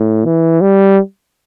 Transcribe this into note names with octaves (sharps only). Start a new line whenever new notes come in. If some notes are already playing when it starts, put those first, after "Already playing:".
Already playing: A2
E3
G3